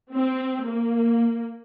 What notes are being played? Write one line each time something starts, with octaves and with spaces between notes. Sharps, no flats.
C4
A#3